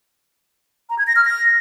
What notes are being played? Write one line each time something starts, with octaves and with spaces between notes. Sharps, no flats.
A#5
G#6
A#6
F6
A#6